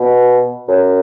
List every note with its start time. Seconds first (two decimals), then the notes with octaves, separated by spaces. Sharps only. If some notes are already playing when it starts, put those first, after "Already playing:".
Already playing: B2
0.68 F#2